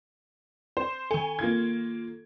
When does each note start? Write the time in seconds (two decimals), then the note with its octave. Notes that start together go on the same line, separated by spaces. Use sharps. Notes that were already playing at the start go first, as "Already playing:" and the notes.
0.77 C5
1.11 D#3 A4 G#5
1.39 A#3 F4 G#6